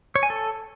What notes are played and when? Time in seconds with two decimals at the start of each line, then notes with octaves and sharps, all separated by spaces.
0.16 C#5
0.23 G#5
0.30 A4